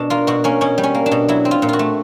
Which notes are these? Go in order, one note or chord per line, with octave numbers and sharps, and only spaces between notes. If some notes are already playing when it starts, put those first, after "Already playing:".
Already playing: B2 D4
A#3 F4
B2 F#4
A#3 C#4
B2 C#4
G3
C#4
A#3
D4
B2
F#3 E4
C4
F4
A#2
F4 F#4
A3